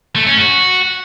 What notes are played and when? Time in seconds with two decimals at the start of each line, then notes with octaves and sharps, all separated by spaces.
0.16 A3
0.27 C#4
0.37 F#4